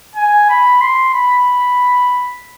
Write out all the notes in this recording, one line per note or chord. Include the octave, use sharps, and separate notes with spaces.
G#5
B5
C6
B5